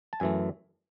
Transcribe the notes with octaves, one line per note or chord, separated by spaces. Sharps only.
A5
F#2 E3 A3 G#5